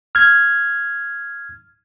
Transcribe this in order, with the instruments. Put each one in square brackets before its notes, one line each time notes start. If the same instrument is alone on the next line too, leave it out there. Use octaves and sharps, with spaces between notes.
[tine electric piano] F6 G#6